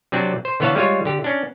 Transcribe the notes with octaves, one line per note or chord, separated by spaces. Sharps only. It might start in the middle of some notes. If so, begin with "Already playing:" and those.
C3 F#3 C4 D4
C5
D3 E3 B3 C#5 F5 A5
G3 G#3 F4 C#5
D3 G4
C#4 D4